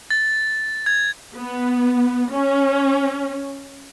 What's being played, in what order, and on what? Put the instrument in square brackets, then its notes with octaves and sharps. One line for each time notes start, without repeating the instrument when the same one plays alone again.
[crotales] A6
G#6
[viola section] B3
C#4